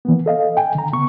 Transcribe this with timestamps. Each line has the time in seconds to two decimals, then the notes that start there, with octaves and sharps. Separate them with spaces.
0.05 E3 A#3 B3
0.26 A4 D#5 F5
0.57 G5 G#5
0.75 D3 A#5
0.93 C#3 B3 C#6